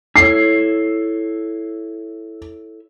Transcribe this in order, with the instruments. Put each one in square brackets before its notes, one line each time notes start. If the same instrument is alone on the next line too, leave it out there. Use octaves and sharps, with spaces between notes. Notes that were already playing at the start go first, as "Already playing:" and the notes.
[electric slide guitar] E4 A4 C#5 [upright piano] C7